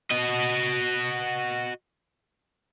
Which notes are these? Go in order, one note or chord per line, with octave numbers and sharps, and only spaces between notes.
F#4 D#5